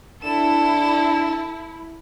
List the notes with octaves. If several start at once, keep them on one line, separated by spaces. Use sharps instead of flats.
D4 E4 A4 E7